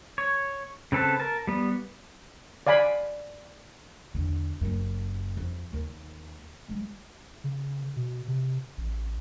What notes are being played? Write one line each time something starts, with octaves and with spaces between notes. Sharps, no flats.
C#5
C#3 C4 A4 B4 A5
A#4 A5
G3 B3
D5 F5 G#5 B5
E2 D3
F#1 F#2
F2
D#2 D#3
G3 G#3
C#3
B2
C3
A1